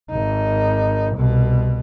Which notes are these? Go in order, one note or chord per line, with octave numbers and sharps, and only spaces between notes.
G#1 D#4
C2 B2